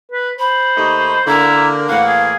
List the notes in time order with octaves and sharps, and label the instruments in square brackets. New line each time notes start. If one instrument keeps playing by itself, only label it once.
[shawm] B4
[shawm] C5 [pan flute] B5
[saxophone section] D#2 A3 D#4
[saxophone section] D3 A#3 [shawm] E4 [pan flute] A#5
[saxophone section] A2 E3 A#3 [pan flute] F5 [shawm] F#5
[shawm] G#4